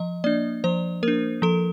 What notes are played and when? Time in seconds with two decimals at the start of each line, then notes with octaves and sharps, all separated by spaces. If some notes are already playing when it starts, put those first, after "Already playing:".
Already playing: F3 D#5
0.24 A#3 D4 D5
0.64 F3 C5
1.03 A#3 D4 A#4
1.42 F3 A4